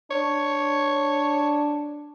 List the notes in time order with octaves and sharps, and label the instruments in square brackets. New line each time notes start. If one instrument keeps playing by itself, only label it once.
[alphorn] D4 [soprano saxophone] C#5